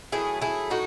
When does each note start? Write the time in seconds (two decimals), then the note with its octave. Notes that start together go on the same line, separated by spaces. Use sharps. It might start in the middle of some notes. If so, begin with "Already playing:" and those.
0.12 D#3 F#3 A3 E4 G#4
0.42 E4 G#4
0.70 A2 D#4 F#4